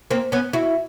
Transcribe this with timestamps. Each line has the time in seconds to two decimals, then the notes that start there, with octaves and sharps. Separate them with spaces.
0.11 A#3 C4
0.32 B3 C#4
0.53 E4 F#4